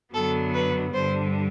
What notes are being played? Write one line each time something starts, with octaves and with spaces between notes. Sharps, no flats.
F#2 D3 F#3 B3 A4
B4
G2 D3 G3 C5